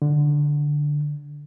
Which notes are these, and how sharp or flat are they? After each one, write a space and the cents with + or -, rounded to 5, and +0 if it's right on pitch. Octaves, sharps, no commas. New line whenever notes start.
D3 +0